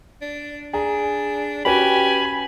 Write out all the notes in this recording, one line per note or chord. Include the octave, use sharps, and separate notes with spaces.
D4
D4 G#4 A#5
C#4 F#4 G4 B4 G#5 B5